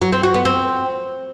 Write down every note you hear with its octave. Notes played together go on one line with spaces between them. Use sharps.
F#3
C4
F#4
B3
C4